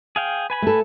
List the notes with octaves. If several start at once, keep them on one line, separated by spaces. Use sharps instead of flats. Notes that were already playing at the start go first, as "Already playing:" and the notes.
G#4 F5 G5
B4 G#5 B5
A3 A4